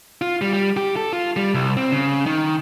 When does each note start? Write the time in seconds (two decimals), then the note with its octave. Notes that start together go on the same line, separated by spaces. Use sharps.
0.22 F4
0.41 G3
0.53 G3
0.77 G4
0.96 A4
1.13 F4
1.36 G3
1.54 C2
1.77 C4
1.92 C#3
2.26 D#3